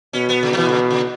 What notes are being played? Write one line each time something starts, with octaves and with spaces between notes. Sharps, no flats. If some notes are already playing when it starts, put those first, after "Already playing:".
B2 C#4
B3
C#3
F#3
B2 E3
C#3
C#3